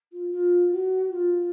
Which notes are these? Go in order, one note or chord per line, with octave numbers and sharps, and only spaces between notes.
F4
F4
F#4
F4